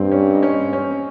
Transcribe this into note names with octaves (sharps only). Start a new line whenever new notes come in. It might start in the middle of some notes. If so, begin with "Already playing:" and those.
Already playing: G2 C4
C#4
D#4
C#4
C#4